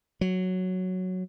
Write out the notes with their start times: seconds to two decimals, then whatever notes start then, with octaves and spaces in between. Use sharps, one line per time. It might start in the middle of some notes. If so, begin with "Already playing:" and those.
0.21 F#3